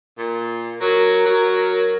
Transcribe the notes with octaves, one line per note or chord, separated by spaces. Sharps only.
A#2
F#3 A#4
F#3